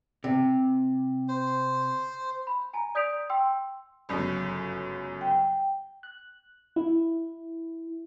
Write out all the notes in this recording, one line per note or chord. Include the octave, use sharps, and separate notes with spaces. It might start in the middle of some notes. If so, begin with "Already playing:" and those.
C3
C5
B5
G#5 A#5
D5 D#6 G6 B6 D7 F7
G5 C6 E6
G1 C#2 F#2
G5
F#6
E4